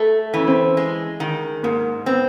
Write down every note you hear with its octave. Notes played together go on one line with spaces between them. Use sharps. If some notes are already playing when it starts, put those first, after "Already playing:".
Already playing: A3
E3 C#4
C4
G#3
D#3
G#2 A#3
B3 C4